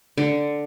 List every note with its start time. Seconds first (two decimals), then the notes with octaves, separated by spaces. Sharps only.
0.18 D3